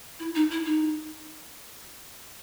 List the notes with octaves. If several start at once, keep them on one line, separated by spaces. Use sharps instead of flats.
E4
D#4
E4
D#4